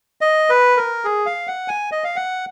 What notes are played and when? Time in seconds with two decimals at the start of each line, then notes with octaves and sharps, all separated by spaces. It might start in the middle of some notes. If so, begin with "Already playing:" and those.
0.21 D#5
0.50 B4
0.77 A#4
1.05 G#4
1.26 F5
1.47 F#5
1.68 G#5
1.92 D#5
2.04 F5
2.16 F#5